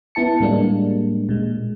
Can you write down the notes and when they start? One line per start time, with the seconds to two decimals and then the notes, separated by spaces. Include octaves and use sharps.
0.15 B3 E4 A5 C#7
0.40 A2 G3 G#3 A#3 D4
1.29 A#2 G#3